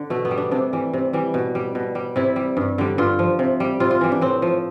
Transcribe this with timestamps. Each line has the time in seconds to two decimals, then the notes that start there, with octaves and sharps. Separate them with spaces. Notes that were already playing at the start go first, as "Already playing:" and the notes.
Already playing: D3
0.10 B2 A3
0.25 B3
0.31 G3
0.38 D4
0.51 C3 D4
0.73 E3 G3
0.93 C3
1.13 E3 G3
1.34 B2
1.55 G3
1.75 B2
1.95 G3
2.16 C3 E4
2.36 G3
2.57 G2
2.78 D3 G3
2.98 G2 F4
3.19 F3
3.39 C3
3.60 G3
3.80 C3 F4
3.91 F4
4.01 E3 G3
4.12 D4
4.21 A2 C4
4.42 F3